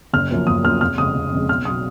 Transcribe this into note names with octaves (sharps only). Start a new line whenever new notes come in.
F#1 F6
F#2 F3 A#3
F#1 D#6
F#2 F3 A#3 F6
F1 F6
F2 C#3 G#3 D#6
F1
F2 C#3 G#3
B1 F6
B2 F#3 D#6